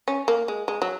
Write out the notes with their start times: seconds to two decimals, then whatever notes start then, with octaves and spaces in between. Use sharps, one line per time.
0.08 C#4
0.28 A#3
0.48 G#3
0.68 G#3
0.82 F#3